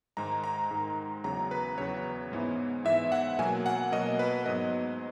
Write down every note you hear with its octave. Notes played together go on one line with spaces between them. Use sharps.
G#2 D#3 G#3 A#5
A#5
G#2 D#3 G#3
E2 C#3 F#3 A#5
B4
E2 C#3 F#3 C#5
G#2 E3 B3
G#2 E3 B3 E5
F#5
B2 F#3 A#3 G#5
F#5
B2 F#3 A#3 D#5
B4
G#2 F#3 B3 D#5